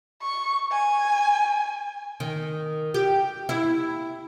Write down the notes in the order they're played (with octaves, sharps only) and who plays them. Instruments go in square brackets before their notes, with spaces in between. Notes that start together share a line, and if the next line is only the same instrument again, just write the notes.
[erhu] C#6
G#5
[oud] D#3
G4
E4